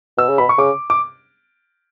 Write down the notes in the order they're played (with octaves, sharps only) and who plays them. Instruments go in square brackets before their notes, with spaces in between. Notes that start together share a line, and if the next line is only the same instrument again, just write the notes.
[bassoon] B2 [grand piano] E6
[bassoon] C#3
[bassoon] B2 [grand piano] B5
[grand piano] C#6
[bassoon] C#3 [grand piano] D6
[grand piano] D6